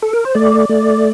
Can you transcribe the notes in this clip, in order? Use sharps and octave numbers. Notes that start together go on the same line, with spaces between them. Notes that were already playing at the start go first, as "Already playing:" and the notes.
A4
A#4
C5
A3 D5
A3